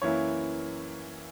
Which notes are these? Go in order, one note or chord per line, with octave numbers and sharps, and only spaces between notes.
F#2 E3 A#3 E4 C#5